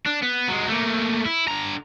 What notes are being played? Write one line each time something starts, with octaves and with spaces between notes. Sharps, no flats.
D4
B3
F#3 G#3
A3 A#3
E4
D3 A#5